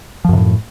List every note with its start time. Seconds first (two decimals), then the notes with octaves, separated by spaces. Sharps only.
0.25 F3
0.29 F#2
0.33 C3
0.37 A2